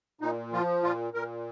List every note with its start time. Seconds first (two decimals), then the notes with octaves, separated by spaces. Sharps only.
0.21 A#2 D#4
0.53 F3 F4
0.83 A#2 F4
1.14 A#2 A#4